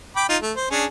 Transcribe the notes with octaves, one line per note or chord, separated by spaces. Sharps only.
G5 B5 D6
D#4 F4
A3
C5
C#4 D4 G#4